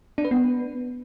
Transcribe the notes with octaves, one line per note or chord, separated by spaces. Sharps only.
D4
B4
B3